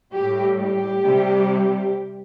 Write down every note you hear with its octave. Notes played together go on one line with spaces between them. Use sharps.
A2 G3 G4
G4
C3 G3